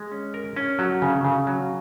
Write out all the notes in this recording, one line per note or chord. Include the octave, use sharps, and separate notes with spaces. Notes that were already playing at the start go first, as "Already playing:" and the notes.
Already playing: G#3
C#4
A#4
C#4
F#3
C#3
C#3
F#3